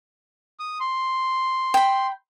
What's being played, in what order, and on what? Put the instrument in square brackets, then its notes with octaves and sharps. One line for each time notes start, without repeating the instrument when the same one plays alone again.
[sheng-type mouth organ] D#6
C6
[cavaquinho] G5 B5